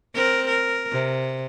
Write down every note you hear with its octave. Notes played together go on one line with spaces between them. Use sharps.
C4 A#4
A#4
C3